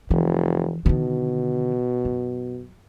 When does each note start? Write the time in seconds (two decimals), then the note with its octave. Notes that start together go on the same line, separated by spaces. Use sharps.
0.10 F1 E3
0.86 B2 D3 D#3
2.05 F#2